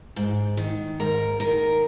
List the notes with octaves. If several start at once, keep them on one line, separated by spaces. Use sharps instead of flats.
G#2
D#3
G#2 A#4
D#3 A#4